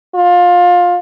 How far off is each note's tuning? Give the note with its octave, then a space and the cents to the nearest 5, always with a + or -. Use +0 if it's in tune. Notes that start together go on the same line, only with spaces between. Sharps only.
F4 +20